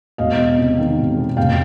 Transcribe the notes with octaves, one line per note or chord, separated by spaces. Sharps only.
E1 D#5 F5
E2
C3
D#3
E1
E2
F1 F5 G5